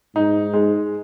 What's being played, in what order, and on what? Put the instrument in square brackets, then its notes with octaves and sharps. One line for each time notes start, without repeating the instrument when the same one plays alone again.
[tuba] G#2 [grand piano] D#4
[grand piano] G#3